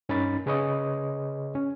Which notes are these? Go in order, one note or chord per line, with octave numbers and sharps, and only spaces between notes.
G2 C#4 D#4 A#4 B5 A6
C#3 G#4 B4 C#5 D#5 D#6
C#4